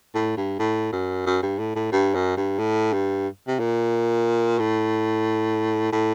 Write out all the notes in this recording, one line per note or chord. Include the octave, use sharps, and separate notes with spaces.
A2
G2
A2
F#2
F#2
G2
A2
A2
G2
F#2
G2
A2
G2
C3
A#2
A2
A2